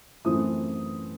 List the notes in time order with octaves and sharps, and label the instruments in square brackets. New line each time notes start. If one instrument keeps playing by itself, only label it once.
[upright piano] F#2 E3 A3 C4 E4 D#6